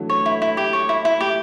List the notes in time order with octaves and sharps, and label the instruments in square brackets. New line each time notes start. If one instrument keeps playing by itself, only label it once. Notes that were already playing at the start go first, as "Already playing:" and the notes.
Already playing: [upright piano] D3 E3 F#3 A3
[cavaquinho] C#5
E4
E4
G4
C#5
E4
E4
G4